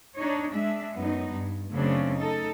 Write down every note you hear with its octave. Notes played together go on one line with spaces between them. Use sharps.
D4 D#4 C#5
G#3 D4 E5
F#2 B3 D#4
G2
F#2 C#3 A3 C4 D4
D#4 A4